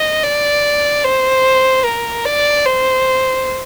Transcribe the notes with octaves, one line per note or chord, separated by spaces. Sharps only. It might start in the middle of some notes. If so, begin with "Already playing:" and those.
Already playing: D#5
D5
C5
A#4
D5
C5